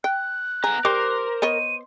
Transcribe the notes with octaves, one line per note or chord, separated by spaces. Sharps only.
G5 F#6
B3 G#4 A#5
G3 A#4 C5 C6 D6
B3 C#5 D#5 D#7